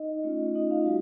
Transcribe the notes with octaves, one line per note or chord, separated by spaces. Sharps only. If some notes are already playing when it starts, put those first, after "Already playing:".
Already playing: D#4 D#5
A3 C#4 F4
D#4 D#5
F4 F5
G3 F#4